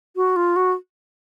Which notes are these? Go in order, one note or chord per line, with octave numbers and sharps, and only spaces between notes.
F#4
F4
F#4